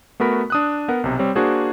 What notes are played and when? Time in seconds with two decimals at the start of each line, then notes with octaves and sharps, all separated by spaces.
0.20 A3 B3 F#4 A#4 B5 B6
0.50 D4 D#6 F#6
0.88 B3 A#4 F#5
1.04 B1 C3
1.19 G3 C4 C#5
1.35 A#3 D4 F#4 G#4 C5